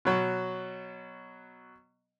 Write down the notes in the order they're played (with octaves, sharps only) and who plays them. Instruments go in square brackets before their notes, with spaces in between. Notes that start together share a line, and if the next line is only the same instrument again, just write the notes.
[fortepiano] B2 F#3